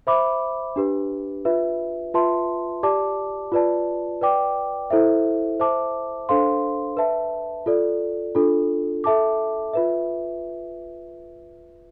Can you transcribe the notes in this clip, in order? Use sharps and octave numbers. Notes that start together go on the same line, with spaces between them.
C5 E5 B5 D6
D4 G4 B4
F4 B4 E5
F4 B4 E5 A5 C6
G4 D5 A5 D6
F4 B4 D5 A5
B4 D5 G5 D6
E4 A4 C5 E5
C5 E5 A5 D6
D4 A4 C5 F5 C6
B4 E5 A5
F4 A4 D5
D4 F4 A4
A4 E5 A5 D6
F4 B4 E5